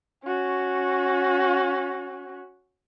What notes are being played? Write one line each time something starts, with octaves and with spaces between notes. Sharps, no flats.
C#4 F#4